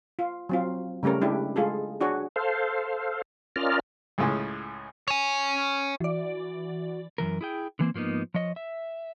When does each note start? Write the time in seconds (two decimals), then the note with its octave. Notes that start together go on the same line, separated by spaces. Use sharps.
0.19 F4
0.49 F#3 C4 F4
1.03 C#3 G3 A3 C#4 A#4
1.21 G#3 D4 E4 G4
1.56 G#3 F4 G#4 A4
2.01 D4 F#4 G#4 C#5
2.36 A4 C5 F5
3.56 C#4 F4 A#4 D5 D#5 F6
4.18 C#2 A2 C#3 G#3
5.08 C#5 G#5
6.00 E3 F#4 D5
7.18 F#2 B2 E3 A#4
7.41 E4 G#4 G5
7.79 D3 E3 A#3 C4
7.94 G#2 F3 A#3 B3 D#4
8.34 F3 C#5 D#5
8.56 E5